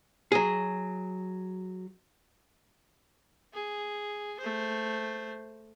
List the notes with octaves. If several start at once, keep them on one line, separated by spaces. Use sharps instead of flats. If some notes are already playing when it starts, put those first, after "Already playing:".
F#3 G#4
G#4
A3 C5